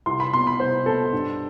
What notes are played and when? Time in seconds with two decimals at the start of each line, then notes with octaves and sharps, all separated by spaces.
0.06 C2 C6
0.20 B5
0.33 B2 C6
0.47 B5
0.60 C2 C5
0.86 B2 A4
1.13 G2